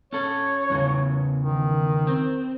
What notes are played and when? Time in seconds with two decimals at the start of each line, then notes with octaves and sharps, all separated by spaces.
0.13 C#4 A4 C#5
0.70 E2 A#2 C#3
1.40 D#3
2.07 C4